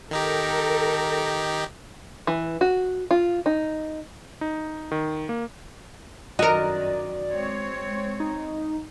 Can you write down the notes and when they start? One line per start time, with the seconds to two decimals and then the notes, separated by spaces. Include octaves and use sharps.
0.11 D#3 D#4 G4 A4 A#4
2.27 E3
2.61 F#4
3.11 F4
3.46 D#4
4.41 D#4
4.92 D#3
5.29 A#3
6.39 F#2 D#3 F#4 A#4 D5 D#5
7.30 G#3 C4 C#5
8.20 D#4